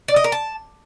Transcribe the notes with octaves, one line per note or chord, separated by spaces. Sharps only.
D5
D#5
A#4
A5